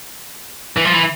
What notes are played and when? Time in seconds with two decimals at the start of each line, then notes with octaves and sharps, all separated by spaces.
0.77 E3
0.85 F3
0.93 E3